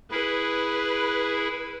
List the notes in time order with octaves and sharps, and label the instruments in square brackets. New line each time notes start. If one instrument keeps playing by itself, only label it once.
[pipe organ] E4 G#4 [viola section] B4